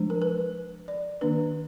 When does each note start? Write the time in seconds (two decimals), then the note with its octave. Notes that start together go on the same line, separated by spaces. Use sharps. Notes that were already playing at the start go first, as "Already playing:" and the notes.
Already playing: F3 G#3 D4
0.10 A#4
0.22 B4
0.88 D5
1.21 D#3 A#3 D4 B4